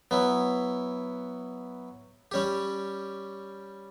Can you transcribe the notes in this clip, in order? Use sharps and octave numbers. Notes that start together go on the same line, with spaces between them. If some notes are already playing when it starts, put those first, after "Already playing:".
F#3 B3 E4
G3 C#4 G4